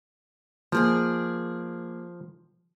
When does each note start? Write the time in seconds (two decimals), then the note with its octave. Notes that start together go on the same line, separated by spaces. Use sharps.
0.72 F3 A#3 G#4 D5